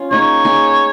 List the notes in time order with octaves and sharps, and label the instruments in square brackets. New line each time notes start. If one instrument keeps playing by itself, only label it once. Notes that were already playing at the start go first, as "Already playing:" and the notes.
Already playing: [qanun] C#4 F4
[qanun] A#3 D#4 G#4 [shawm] C#5
[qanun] A#3 D#4 G#4